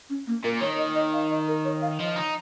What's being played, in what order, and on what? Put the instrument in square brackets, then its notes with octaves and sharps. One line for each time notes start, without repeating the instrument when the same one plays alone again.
[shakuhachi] C#4
A#3
[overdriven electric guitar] A#2 [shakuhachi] A#4
[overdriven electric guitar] D#3 [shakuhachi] C#5
[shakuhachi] D#5
D#5
F5
D#5
A#4
C#5
F5
[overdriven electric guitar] F3 [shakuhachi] D#5
[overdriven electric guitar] D#4